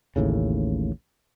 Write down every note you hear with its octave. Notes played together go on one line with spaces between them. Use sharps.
A1 D#2 A2 C#3